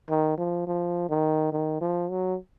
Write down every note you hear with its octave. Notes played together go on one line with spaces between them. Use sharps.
D#3
F3
F3
D#3
D#3
F3
F#3